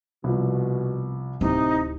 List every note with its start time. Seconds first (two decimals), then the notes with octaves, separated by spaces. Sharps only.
0.24 C2 B2 F3
1.41 D1 C3 D#4 E4